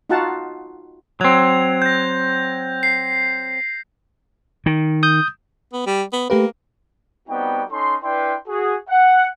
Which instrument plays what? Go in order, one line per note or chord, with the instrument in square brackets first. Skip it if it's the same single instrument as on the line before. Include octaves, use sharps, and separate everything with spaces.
[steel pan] D#4 F4 F#4 F5 F#5 A5
[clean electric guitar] F#3 C4 [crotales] G#6 F7
[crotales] G6 A#6
C7
[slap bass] D#3
[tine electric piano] D#6 G6
[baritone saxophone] B3
G3
B3
[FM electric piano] A3 G4 B4 [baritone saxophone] A#3
[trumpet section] G3 B3 C4 D#4 F#4 G5
C#4 D#4 A4 C6
D4 E4 B4 G5 C6
F#4 G#4
F#5